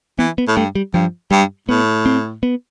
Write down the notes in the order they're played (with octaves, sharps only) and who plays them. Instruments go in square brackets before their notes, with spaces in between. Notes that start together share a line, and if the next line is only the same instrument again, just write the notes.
[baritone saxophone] E3 [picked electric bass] B3
[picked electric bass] B3
[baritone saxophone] A2
[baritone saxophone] G2 [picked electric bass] A3
[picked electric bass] G3
[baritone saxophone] G2 [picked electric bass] F3
[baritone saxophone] G2 [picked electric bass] G3
[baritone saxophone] A2 [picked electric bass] B3
[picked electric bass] C4
B3